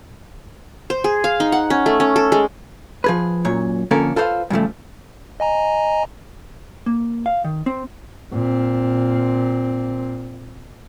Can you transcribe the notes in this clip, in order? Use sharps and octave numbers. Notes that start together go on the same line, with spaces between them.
C5
G#4
F5
D#4
F#5
C#4
A3
C#4
A4
G#3
F3 G#4 B4
F#2 A#2 C#5
F2 D3 A#3 C#4 A4 A#4
F4 A4 B4 C5 F5
G2 C#3 F3 A3
D#5 G#5 A#5
A#3
F5
D#3
C4
A#2 C4